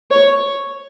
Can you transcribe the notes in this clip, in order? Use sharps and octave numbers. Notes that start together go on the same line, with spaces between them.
C#5